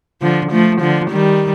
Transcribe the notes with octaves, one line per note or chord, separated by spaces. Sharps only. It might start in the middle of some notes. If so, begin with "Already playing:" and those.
D3 F3
F3 A3
D3 F3
D#3 G3